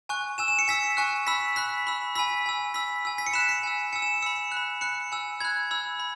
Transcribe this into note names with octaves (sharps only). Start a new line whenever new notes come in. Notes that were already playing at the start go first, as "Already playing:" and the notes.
G#5 C#6 F#6
G#5 E6 E7
E7
C#7
G#5 E6 B6
G#5 C#6 F#6
B5 E6 B6
B5 F#6 B6
B5 E6
G#5 B5 E6 B6
G#5 E6
B5 E6 B6
G#5 E6
B6
C#7
B5 F#6 E7
B6
G#5 E6
G#5 E6 C#7
E7
B5 E6 C#7
F#6
B5
B5 F#6 C#7
G#5 E6
B5 F#6 G#6
B5 E6
B5